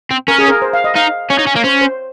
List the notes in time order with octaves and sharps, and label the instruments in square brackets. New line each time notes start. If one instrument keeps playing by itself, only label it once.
[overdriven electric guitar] C4
[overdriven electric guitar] C#4 [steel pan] A#4
[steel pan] G#4
A#4
C5
F5
D#5
[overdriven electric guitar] D#4 [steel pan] F5
[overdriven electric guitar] C#4 [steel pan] C#5
[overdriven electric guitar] D#4
C#4
A#3
[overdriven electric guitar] C#4 [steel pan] C5
[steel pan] C5